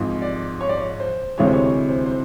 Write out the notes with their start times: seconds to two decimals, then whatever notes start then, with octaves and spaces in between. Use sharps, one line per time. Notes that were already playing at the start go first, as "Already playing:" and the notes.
Already playing: G#1 G#2 F3 G#3
0.22 D5
0.61 C#5
0.69 D5
0.77 C#5
1.00 C5
1.38 D2 C3 E3 G#3 C#5
1.46 C5
1.53 C#5
1.64 C#5
1.89 C5
2.06 C5